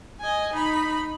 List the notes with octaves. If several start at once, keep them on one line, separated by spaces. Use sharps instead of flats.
D#5 G#5
D#4 B5